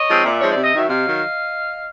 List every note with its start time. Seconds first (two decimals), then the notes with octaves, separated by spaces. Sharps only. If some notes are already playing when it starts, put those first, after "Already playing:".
Already playing: C#5 D#5
0.08 F3 G#3 C4 D#4
0.24 A#2 D5 E5
0.39 F3 G#3 C4 D#4 C#5
0.51 D5
0.56 C3
0.64 D#5
0.73 D#3 F#3 E5
0.88 C3 D#5 F5
1.04 D#3 F#3